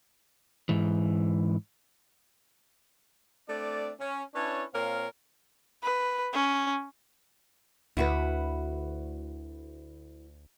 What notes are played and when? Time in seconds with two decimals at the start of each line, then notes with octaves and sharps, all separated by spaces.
0.69 G#2 E3
3.48 A3 C4 D4 D5
4.00 C#4
4.34 C#4 D4 E4 B4 C#5 A5
4.73 A#2 C4 A#4 C#5 F5
5.83 B4
6.33 C#4
7.97 D2 E4 F#4 B4